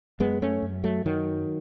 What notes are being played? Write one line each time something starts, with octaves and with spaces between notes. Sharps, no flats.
F#2 G#3 B3
A3 C#4
F#2
F#3 A3
F#2 D#3 F#3